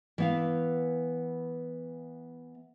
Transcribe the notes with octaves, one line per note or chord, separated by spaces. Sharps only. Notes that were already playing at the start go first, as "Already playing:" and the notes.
E3 B3 F5